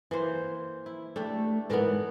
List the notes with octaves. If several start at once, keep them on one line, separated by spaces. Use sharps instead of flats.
E3 A#3 C5
E4
A3 D4 G4 A4
G#2 E3 B3 A4 A#4